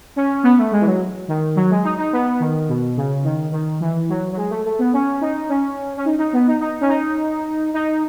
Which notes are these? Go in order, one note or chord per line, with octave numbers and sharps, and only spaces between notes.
C#4
B3
A3
G#3
E3
F#3
D#3
F#3
G#3
D#4
D#4
B3
D#3
B2
C#3
D#3
D#3
E3
F#3
F#3
G#3
A3
A3
B3
C#4
D#4
C#4
C#4
D#4
D#4
B3
D#4
D#4
C#4
D#4
D#4